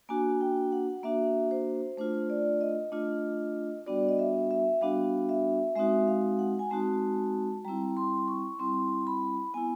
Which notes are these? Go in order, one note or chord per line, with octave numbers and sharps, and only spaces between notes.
A#3 D4 F#4 G#5
G5
F#5
A#3 D4 F#4 E5
C5
A3 D4 F4 C5
D5
D#5
A3 D4 F4 D#5
G3 B3 D4 F#4 D5
D#5
E5
E5
G3 B3 D4 F#4 F5
E5
G#3 C4 D#4 F#4 E5
F5
F#5
G#5
G#3 C4 D#4 F#4 A5
G3 C4 E4 A#5
C6
C#6
G3 C4 E4 C6
B5
B3 E4 G#5